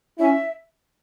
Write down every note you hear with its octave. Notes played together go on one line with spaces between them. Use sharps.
C#4 E4 E5